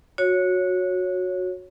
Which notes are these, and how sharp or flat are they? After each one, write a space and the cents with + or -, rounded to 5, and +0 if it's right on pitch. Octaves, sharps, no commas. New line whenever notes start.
F#4 -20 C#5 -5